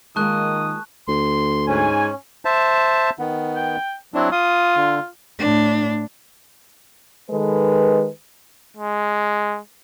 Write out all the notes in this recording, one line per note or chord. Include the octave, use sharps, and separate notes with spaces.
D#3 G#3 A#3 F4 A5 C#6 D#6 F#6
D2 C6
G#2 C#4 G#5
C5 E5 A5
D#3 B3
G5
F#3 C4 D4 E4
F4 D#6
D3
A2 D4
D#3 G#3 A4 B4
G#3